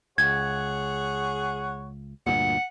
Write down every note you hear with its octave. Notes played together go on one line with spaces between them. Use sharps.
C#2 G#4 C#5 F#5 G#6
D2 G2 A#2 F#5